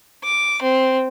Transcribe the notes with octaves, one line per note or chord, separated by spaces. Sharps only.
D6
C4